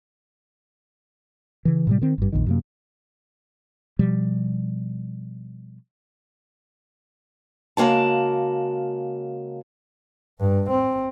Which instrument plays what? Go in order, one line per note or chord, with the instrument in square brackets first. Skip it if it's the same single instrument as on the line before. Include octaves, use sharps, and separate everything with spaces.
[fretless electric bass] C#3 E3
A2 C3 G3
D#3 C4
G#1 G2
A#1 F2 D#3
F#2 C3 A#3
B2 F3 G3
[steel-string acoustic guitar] C#3 G#3 A#3 F#4 A5
[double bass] G2
C4